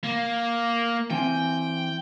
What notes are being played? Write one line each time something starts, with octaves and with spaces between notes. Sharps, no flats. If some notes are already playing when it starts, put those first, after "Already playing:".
A#3
E3 C4 G5 G#5